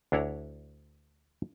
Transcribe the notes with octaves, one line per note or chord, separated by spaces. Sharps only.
D2 D4 E4 C#5 F#5 A#5